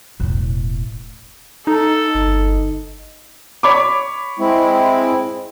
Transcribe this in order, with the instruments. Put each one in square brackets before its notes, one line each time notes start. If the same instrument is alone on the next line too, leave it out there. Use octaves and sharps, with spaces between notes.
[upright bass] E1 A2
[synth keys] D#4 [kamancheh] A4
[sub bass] G1
[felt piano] C#5 B5 D6
[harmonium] G#3 C4 E4